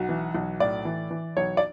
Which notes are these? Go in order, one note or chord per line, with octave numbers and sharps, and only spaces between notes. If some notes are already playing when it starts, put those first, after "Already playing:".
Already playing: B1 F#4
E3
B1
A2 D5
E3
E3
B1 C#5
D5